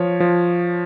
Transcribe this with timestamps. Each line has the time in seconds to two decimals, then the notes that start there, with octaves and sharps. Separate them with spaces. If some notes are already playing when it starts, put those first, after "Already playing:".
Already playing: F3 C#5
0.20 F3